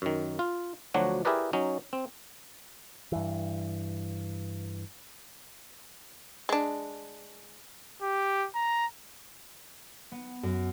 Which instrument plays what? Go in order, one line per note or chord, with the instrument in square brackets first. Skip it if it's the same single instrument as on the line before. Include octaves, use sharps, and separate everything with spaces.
[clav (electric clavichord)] F#2 D#3
F4
D2 F3 F#3 D4 F#4 C#5
E4 G4 G#4 A#4 B4 D5
F#3 C#4 D#4
C4
[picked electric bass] G2 E3
[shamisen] G#3 D4
[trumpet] G4
A#5
[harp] B3
F#2